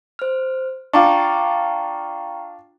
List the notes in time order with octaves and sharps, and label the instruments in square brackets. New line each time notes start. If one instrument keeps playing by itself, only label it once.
[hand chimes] C5 F6
[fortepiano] D4 F4 [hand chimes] G5 A#5 C#6